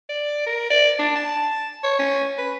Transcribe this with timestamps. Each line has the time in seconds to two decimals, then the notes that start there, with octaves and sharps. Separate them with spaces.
0.09 D5
0.47 A#4
0.70 D5
0.99 D4
1.16 A5
1.84 C#5
1.99 C#4
2.38 B4